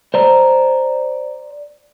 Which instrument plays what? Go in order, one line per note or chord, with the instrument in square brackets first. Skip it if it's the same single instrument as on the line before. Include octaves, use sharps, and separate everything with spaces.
[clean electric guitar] C5 D5 A#5